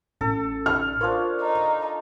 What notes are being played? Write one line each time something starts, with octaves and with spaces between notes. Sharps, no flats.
A1 A2 C#4 A4
F6
D4 F4 A#4 C5 C#5
D#4